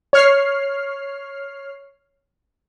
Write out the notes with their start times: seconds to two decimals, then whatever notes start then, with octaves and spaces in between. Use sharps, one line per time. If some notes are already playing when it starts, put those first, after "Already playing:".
0.13 C#5 F6 C7